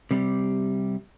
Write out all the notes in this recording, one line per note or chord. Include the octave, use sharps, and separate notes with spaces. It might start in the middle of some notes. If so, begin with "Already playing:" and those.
C3 G3